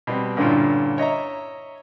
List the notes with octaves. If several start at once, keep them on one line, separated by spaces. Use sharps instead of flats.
B2 G3 C4
G2 A#2 D3 C#4 E4 F4
C#5 D#5 E5 A#5